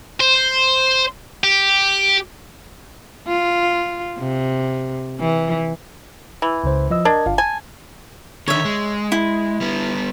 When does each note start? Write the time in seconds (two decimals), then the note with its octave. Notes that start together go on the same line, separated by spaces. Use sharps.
0.20 C5
1.44 G4
3.28 F4
4.19 C3
5.20 E3
6.42 E3
6.64 C#2 C#3 C5
6.91 F3 D#5 E6
7.05 D4 A#4 D#5 G#6
7.26 G1 F4 F5
7.38 G#5 A5
8.48 D3 D#3 C#5 E5
8.65 G#3
9.12 E4
9.61 G3 B3